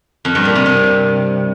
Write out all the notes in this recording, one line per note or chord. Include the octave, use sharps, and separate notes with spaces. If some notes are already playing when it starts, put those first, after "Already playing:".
F2
G2
A#2
C3
C3